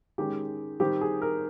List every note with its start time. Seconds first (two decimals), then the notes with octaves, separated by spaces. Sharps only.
0.18 D#3 G#3 C#4 G4
0.80 D#3 G3 C4 G4
1.01 G#4
1.22 A#4